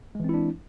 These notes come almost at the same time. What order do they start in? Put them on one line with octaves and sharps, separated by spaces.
G#3 E3 C4 E4 D4